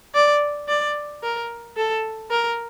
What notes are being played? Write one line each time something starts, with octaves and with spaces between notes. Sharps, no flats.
D5
D5
A#4
A4
A#4